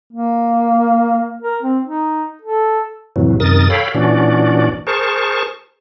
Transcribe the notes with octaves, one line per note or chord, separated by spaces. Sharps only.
A#3
A#4
C4
D#4
A4
F2 A2 C3 E3 F#3
F#2 C3 D#3 A#4 D#6 A6
A4 C#5 F5 G5 B5
A#2 E3 C#4 D4 F#4 D5
G#4 A#4 C5 A5 C#6